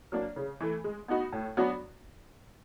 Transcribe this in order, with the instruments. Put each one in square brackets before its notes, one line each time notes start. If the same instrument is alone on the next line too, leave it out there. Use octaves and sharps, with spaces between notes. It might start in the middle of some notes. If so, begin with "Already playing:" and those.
[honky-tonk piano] F#3 A#3 D4
C#3
E3 A3
G#3
B3 D#4 F#4
A2
F#3 B3 D4 F#4